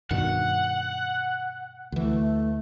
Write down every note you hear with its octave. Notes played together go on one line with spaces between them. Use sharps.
G2 B2 D#3 F#5
D2 E3 A3